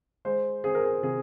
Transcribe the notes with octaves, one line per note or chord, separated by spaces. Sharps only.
G#3 C5
C4 G#4
A#4
G#4
C3 G#4